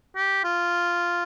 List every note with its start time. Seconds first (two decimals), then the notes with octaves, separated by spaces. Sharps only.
0.16 G4
0.44 F4